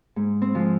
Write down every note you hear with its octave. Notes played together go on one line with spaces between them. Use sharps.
G#2
C4
F3 G#3